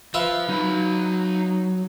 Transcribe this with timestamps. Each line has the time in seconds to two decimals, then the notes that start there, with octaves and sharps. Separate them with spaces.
0.14 F3 F4 B4 E5
0.49 F#3 D#4 B5